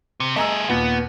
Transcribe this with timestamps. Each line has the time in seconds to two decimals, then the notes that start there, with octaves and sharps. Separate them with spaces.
0.20 C3
0.36 A3 G#4 D#5 A#5 E6
0.69 D#2 A#2 B3